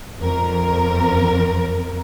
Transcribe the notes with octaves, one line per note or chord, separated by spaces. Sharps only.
F2 A#4